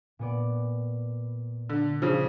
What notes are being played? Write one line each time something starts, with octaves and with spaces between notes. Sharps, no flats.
A#2 B3 D5
D3
C#3 F3 D4